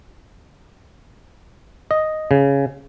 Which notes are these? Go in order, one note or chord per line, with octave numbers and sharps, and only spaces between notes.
D#5
C#3